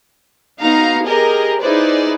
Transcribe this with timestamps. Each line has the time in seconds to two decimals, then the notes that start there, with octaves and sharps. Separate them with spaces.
0.61 B3 D#4 F#4 F5 A#5
1.04 G4 G#4 A#4 D#5
1.61 D#4 E4 G#4 B4 C5 D5